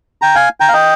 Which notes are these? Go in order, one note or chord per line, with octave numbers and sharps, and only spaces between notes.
G5 A#5
F5 G#5
G5 A#5
F5
D#5 G5